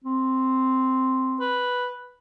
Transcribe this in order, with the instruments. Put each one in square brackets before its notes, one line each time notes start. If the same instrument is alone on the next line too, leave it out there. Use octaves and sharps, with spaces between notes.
[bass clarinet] C4
[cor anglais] B4